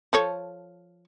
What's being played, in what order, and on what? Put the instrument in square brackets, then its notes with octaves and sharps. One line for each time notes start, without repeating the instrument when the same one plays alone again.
[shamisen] F3 A4 C#5